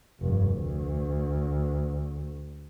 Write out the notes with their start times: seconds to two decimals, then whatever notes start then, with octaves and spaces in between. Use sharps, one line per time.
0.21 F1 G2
0.51 D2